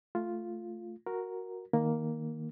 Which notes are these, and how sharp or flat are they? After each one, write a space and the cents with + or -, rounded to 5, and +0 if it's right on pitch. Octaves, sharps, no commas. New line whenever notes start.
A3 +0 F4 +0
F#4 -5 A#4 +0
D#3 +0 A#3 +0